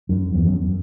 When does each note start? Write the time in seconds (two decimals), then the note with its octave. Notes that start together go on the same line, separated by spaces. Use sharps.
0.09 F#2
0.34 E2
0.47 F#2